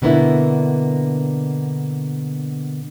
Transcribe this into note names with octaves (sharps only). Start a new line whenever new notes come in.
B2 D3 A#3 B3 D4 E4